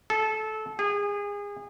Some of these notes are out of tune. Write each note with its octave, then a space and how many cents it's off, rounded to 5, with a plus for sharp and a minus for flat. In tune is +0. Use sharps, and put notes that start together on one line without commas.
A4 -20
G#4 -30